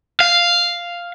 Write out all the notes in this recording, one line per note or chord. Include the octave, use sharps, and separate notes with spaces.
F5